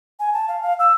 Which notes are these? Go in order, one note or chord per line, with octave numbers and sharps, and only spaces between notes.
G#5
A5
F5
F5
E6